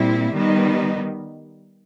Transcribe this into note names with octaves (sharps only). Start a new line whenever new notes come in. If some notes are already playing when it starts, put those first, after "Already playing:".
Already playing: A#2 G3 C4 E4
D#3 G3 B3 D#4